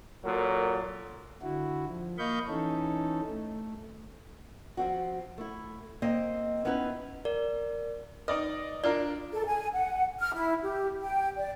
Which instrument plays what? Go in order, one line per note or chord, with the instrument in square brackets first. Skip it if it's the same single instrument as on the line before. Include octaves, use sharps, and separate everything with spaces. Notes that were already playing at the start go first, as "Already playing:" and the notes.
[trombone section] A#2 F#3 A4 A#4
[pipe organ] D3 E4 F#4
F3
A#3 D#5 F5 B5 C#6 G6
E3 C#4 D#4 A4
A3
[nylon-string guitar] F3 C4 F#4
A3 E4
A#3 C4 D#5
B3 C#4 D#4 E4 G4 B4
[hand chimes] A#4 D5
[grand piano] D#4 D5 D#5 [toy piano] B4
[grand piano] D4 F4 A#4 [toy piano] D5
[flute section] A4
G#5
F#5
F6
E4
G4
G5
D5